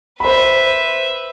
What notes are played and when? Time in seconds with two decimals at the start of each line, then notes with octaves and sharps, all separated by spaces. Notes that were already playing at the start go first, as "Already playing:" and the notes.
0.20 B4 C5 E5 B5